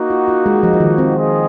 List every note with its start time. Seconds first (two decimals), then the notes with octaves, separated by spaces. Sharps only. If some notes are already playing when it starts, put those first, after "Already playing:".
Already playing: A#3 D#4 F#4
0.10 F4
0.28 F4
0.46 G#3
0.63 F3
0.73 F3
0.80 D#3
0.98 C4
1.16 F4 G#4 D#5